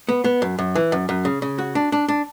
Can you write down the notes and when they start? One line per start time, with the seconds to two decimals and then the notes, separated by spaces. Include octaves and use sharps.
0.09 B3
0.24 B3
0.42 F#2
0.59 F#2
0.75 E3
0.92 F#2
1.09 F#2
1.25 C#3
1.42 C#3
1.58 F#4
1.75 D4
1.92 D4
2.08 D4